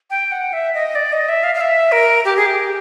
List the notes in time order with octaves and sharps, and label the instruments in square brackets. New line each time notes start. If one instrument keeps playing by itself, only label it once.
[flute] G5
F#5
E5
D#5
D5
D#5
E5
F5
F5
E5
A#4
G4
G#4
G4